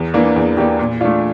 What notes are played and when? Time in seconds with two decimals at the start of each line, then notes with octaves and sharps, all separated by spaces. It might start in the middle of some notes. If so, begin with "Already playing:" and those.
Already playing: E2
0.14 E3 A#3 D4
0.36 E2
0.57 E3 A#3 D4 G4
0.79 A#2
1.01 A3 D4 F4